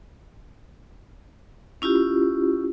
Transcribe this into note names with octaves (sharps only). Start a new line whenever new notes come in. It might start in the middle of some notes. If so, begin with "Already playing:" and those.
C#4 E4 F4 G4